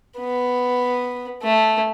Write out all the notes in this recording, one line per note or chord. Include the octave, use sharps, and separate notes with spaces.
B3
A3